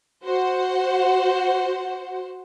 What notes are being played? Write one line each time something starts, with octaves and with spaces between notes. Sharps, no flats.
F#4 C5 F#5